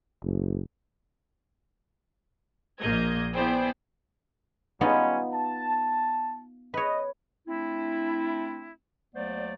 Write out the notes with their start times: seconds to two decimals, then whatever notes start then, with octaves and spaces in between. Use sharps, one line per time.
0.22 F#1
2.80 A#1 A#2 A#3 D#5 G6 G#6
3.35 B3 E4 G#4 C5 D5 G5
4.81 G3 B3 C#4 D#4 F4 G#5
5.33 A5
6.74 B4 C#5 D#5
7.47 A3 C4 D4 E4
9.15 D#2 F#3 A3 B3 C5 D5